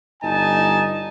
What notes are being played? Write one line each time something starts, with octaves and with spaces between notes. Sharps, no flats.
G1 D#4 G#5 A5